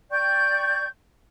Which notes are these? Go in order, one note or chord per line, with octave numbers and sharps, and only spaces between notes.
D5 G5 C#6 G6